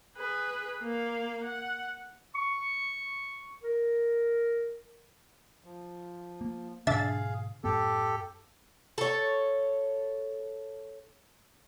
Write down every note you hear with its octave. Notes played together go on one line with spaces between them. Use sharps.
G#4 B4
A#3 F5
F#5
C#6
A#4
F3
A#3
G#2 B2 D3 D4 G#4 E5 F5 A6
F#2 A2 B3 G4 A4
A4 C#5